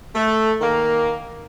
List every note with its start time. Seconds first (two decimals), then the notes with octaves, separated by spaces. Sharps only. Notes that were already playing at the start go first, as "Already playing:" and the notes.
0.15 A3
0.61 D#3 A#3